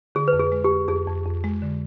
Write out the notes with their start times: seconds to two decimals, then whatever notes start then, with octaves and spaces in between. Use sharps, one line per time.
0.15 D3 G#4
0.28 B4
0.33 F2
0.39 G#4
0.52 G#3
0.64 G4
0.70 F2
0.88 F2 G#4
1.07 F2
1.25 F2
1.44 G#3
1.62 D3